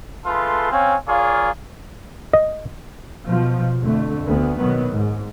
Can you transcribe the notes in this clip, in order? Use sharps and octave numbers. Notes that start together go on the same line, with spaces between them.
A3 F4 G#4 A4 B4 C6
C4 C#4 C#5 F5 G#5
F4 G#4 A#4 C#5 D5 F5
D#5
B2 F3
F2 D3 A3
D2 B3
B2 D#3 F#3 B3
G#2